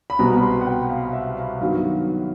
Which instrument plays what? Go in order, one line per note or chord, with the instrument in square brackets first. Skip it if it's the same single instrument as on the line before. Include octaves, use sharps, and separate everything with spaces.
[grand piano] B5
C2 B2 G3 B3 A#5
B5
C6
F#5
G5
F5
E5
F5
G2 D#3 F#3 B3 F5